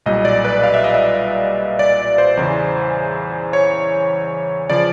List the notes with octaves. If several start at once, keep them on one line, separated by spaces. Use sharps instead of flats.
B1 A#2 G3 D#5
D5
B4
F5
E5
D#5
E5
D5
C5
E2 C#3 E3
C#5
C#3 F3 D5